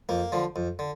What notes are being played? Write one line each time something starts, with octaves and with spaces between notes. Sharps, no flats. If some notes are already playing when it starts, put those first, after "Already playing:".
F2 A#3
D3 F3
F2
D3